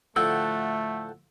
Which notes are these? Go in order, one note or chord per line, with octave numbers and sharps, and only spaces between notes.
A2 D3 F3 A3 A4 F#5 G5 E6